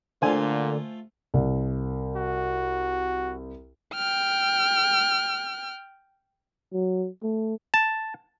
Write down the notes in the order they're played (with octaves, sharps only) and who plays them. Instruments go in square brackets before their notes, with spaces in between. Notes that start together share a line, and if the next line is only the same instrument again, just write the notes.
[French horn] A#2 [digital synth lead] D3 [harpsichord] A3 F4 [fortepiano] C5 G#5
[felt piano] C2
[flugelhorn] F#4
[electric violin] G5 F6
[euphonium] F#3
A3
[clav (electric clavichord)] A5